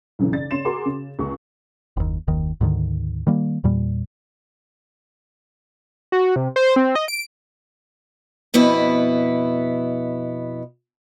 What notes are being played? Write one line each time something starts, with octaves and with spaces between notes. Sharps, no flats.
B1 F#2 C#3 E3
C#3 D5 A6
C#3 C#4 C6 E7
F#4 G#4 A#4 C6 D6
C#3
C#2 G#3 G#4 C#6
F#1 D#2
F#1 D#2 D#3
D2 G#2 D3 D#3
D#3 G3 A#3
E2 A#2 G3
F#4
C3
C5
C4
D#5
D7
F2 B2 B3 E4